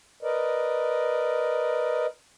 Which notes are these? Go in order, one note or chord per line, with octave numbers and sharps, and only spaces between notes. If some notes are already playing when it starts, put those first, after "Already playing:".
A#4 B4 D5 D#5